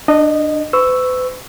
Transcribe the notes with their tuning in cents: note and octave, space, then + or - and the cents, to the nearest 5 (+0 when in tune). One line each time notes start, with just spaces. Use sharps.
D4 +20 D#5 -10
B4 +45 C#6 +0 E6 +0